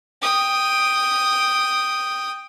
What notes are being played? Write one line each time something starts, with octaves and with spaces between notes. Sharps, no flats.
G5 D#6